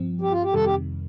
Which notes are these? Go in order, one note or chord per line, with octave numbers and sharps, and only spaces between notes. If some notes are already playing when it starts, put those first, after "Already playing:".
Already playing: G2 F3 C4
G4
F4
G4
F2 C3 D#3 G3 A4
G4